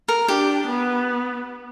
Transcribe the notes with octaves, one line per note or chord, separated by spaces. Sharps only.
A#4
D4 G4
B3